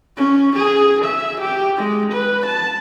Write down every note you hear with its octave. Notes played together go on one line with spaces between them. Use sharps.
C#4
G#4
E5
G4
G#3
B4
A5